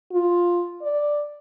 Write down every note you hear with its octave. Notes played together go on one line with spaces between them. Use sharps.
F4
D5